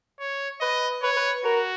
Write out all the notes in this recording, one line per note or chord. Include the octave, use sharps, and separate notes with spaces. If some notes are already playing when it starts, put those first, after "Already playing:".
C#5
B4 D#5
B4 C#5
B4
F#4 A#4